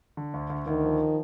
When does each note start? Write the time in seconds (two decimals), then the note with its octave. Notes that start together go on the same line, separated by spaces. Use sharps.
0.17 D3
0.34 D2
0.50 D2
0.67 D2 D#3
0.84 F3